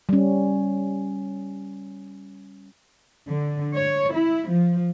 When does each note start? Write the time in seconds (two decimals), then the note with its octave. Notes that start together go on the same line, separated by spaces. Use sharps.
0.09 G3 C#4
3.28 D3
3.75 C#5
4.13 E4
4.49 F3